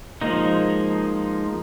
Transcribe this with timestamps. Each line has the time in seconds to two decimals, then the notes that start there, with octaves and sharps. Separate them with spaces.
0.21 F3 G#3 A#3 D#4